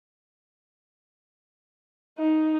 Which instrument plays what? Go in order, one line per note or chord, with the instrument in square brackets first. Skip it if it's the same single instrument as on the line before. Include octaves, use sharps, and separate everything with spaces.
[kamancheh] D#4